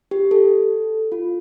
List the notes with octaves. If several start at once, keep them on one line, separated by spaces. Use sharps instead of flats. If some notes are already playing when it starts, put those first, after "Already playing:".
G4
A4
F4